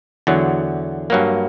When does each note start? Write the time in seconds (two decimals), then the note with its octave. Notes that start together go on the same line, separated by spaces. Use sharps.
0.27 E2 D3 F#3
1.10 G2 F#3 A#3